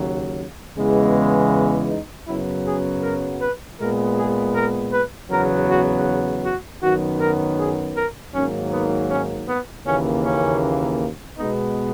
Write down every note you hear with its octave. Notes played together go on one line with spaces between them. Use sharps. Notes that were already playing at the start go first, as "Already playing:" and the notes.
Already playing: D#2 C#3 F#3
E2 C#3 E3 G#3 B3
D#4
F#2 C#3 F#3 B3 E4
G#4
A#4
B4
A#2 G#3 B3 A#4
G#4
A#4
B4
E2 C#3 F#3 B3 A#4
F#4
F#4
F#2 D#3 F#3 B3 F#4
A#4
G#4
A#4
G#2 D#3 F#3 A#3 C#4
B3
C#4
B3
D#2 C#3 E3 A#3 C#4
C#4
B2 G#3 B3 D#4